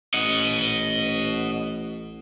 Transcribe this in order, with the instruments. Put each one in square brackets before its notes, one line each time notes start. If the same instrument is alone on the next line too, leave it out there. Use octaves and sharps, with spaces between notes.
[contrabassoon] A1 [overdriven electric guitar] D#5 F#5